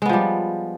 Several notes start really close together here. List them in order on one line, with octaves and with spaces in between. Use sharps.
G#3 B3 F3 G3